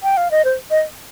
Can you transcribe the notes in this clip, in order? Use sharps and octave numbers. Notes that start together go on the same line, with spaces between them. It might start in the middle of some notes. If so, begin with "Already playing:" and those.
G5
F5
D#5
C5
D#5